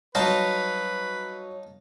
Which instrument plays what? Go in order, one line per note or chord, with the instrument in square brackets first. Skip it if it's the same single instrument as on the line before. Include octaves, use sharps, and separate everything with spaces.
[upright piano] F#3 C#5 [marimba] G3 [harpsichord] D#4 F4 A5 [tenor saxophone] B4